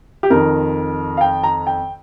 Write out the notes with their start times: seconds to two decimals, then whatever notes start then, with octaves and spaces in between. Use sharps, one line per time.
0.23 G4
0.30 F2 D#3 A#4
1.17 F5
1.21 G5
1.44 A#5
1.67 G5